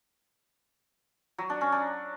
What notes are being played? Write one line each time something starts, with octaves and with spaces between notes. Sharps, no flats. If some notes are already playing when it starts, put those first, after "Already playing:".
F#3
D4
C#4
D4